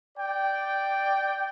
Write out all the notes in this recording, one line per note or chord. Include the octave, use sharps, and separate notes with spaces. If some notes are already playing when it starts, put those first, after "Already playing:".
D5 G5